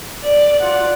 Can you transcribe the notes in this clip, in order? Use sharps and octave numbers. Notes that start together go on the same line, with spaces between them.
D5
F4 D5 F#5